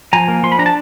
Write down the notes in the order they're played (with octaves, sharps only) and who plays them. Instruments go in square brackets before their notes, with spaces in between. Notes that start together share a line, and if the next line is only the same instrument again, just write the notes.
[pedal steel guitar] F3 G#5 A#5
A#3
F3 C6
B5
D4 A#5
A5